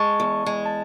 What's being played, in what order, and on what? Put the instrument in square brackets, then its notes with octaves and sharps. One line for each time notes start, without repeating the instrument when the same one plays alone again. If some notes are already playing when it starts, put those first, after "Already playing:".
Already playing: [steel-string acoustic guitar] G#3 [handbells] A5 C#6
[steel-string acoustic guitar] E2
G#3
[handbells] A5